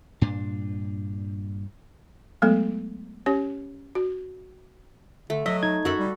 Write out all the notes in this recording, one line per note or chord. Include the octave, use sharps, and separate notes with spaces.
G2 A#2 D4
F#3 G#3 A3 B3 A4
C#4 G4 C#5
F#4
D3 A3
F#3 D#5 E5
D#4 G#6
F#2 F#4 A4 B5
G3